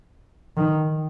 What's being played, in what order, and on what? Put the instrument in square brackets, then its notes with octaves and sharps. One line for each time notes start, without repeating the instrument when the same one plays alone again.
[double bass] D#3